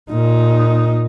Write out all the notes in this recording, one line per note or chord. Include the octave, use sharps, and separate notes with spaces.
A#2 D#4